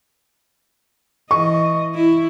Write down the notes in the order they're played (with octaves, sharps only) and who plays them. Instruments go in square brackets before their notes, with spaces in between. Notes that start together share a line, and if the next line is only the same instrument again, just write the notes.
[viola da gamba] E3 D#5 [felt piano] C#6
[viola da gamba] E4